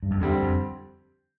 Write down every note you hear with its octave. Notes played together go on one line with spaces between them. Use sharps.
G2
F2
E2 D3 G3 C4
F2